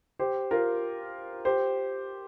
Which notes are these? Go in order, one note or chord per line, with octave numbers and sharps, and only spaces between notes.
G4 C5
F4 A#4
G4 C5